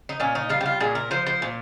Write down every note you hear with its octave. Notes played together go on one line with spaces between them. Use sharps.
D#4
A#2 C#4
D#4
G3 F4
G4
F4
A#2 G#4
A#4
F3 C5
C5
A#2